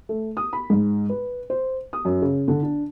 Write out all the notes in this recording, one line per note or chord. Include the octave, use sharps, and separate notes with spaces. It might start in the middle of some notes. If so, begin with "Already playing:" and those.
A3
D#6
B5
G#2
B4
C5
D#6
F#2
C#3
D3
D4